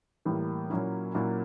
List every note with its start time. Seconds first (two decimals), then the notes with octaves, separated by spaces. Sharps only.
0.25 A2 E3 G3 A#3
0.70 A#2 F#3 A#3 C#4 E4
1.14 A#2 F#3 A#3 C#4 E4